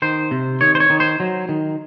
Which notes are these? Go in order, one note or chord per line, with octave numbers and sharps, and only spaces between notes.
D#3 C5
C3
D#3 C#5
C5
C#5
D#3
C5
F#3
D#3